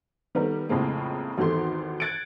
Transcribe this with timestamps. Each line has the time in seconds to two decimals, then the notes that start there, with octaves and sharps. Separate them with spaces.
0.35 D#3 G3 B3 A4 A#4
0.69 F2 A2 C#3 G#3 A#3 C4
1.38 G#1 E2 D#3 G4 A4 C6
2.00 F#6 G#6 A6 C#7 D7